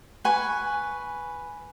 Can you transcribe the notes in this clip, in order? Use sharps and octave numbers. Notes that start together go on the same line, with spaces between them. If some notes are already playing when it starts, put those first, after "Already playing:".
B4 G#5 C#6